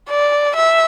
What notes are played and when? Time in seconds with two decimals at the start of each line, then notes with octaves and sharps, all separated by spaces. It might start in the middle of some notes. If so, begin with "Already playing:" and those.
0.10 D5
0.56 E5